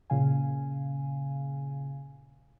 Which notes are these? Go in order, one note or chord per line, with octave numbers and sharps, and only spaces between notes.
A#2 C#3 F5 G#5